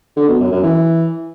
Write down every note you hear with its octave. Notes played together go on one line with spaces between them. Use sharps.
D3
B2
F#2
F#2
E3